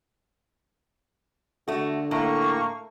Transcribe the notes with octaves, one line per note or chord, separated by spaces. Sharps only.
D3 A3 F#4
A2 A#3 C#6